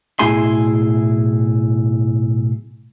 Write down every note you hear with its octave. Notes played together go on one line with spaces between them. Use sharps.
B1 A2 E4 G#4 G#5 C6